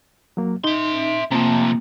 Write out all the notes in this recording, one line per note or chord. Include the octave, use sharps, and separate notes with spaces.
F#3 A#3
D#4 E5 C6
C3 F3 A#3 C4 A5